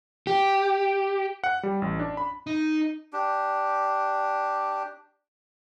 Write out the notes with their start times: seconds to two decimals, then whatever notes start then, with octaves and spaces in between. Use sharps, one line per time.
0.27 G4
1.44 F#5
1.63 G3
1.82 A1
1.99 D4
2.17 B5
2.47 D#4
3.13 D4 G4